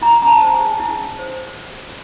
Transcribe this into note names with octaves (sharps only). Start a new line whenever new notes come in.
E4 A#5
C#4 A#5
A5
C5
G#5
G#4
E4
C#4
C5